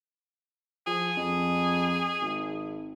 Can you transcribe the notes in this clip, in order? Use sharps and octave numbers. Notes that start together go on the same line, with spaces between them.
F3 G#4
F2
G#1